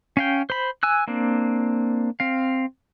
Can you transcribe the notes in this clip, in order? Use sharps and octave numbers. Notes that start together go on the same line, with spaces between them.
C#4 F5 G5
C5 B5
G#5 E6 F#6
A#3 C4 D4
C4 F5